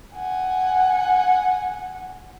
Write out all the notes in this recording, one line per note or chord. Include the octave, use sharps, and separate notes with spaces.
F#5 G#5